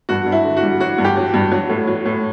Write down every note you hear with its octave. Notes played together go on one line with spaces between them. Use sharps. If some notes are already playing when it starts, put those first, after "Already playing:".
G2 F#4
G2
E4
D3
F#4
G3
F#3 F#4
G2
G4
F#3
G2
F#3
A2
F#3
A2